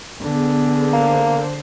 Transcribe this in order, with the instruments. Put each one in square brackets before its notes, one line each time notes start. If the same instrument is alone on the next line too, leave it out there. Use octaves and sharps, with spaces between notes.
[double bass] D3 [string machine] B3 G#4
[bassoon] A#3 [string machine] C5